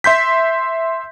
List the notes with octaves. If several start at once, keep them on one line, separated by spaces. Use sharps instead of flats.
E5 C6 G6 B6